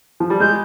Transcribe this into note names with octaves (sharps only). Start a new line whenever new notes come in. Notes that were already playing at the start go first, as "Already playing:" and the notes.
F3
G3
G#3 G6